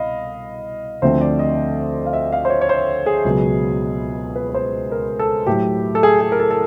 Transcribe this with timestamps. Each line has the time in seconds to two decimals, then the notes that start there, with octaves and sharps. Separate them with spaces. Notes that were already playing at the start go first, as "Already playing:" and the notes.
Already playing: C2 B2 D#5 F5 B5
1.02 D2 D3 F3 A3 C4 C5
1.21 D5
1.39 D#5
2.06 F5
2.13 E5
2.32 F5
2.45 C5
2.50 C#5
2.61 C#5
2.69 C5
3.06 G#4
3.25 C#2 B2 F#3 B3
4.36 B4
4.49 B4
4.54 C5
4.92 A#4
5.19 A4
5.47 A2 F#3 A3 G4
5.95 A4
6.03 G#4
6.21 G#4
6.32 A#4
6.40 A4
6.51 A4